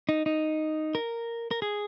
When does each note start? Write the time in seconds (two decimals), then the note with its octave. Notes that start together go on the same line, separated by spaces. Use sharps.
0.09 D#4
0.26 D#4
0.95 A#4
1.51 A#4
1.62 G#4